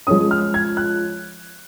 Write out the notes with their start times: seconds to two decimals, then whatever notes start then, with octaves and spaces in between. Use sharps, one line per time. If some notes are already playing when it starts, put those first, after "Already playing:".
0.07 F3 G#3 C#4 D#6
0.31 F6
0.54 G#6
0.77 F#6